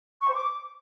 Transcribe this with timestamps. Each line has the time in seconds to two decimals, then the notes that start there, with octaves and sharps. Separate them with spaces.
0.22 C#6
0.28 C5
0.33 D6